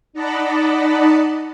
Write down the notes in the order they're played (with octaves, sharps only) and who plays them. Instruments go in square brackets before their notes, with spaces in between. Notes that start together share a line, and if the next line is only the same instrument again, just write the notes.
[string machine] D#4 D5 D#5 F#5 A5 B5